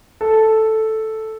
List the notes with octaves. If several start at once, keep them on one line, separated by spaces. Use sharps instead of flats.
A4